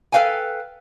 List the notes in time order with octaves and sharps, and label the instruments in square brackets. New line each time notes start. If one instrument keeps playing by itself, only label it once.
[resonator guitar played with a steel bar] A4 B4 E5 F5 G5 G#5